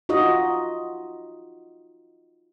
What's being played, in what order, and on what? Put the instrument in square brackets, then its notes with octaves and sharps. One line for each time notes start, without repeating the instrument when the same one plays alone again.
[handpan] D#4 F4 F#4 D#5